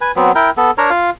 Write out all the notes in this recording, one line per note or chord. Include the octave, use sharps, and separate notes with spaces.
B4 G#5
F#3 B3 C4
E4 A#4 G5
B3 A4
D4 A#4 C#5 A#5
F4 F5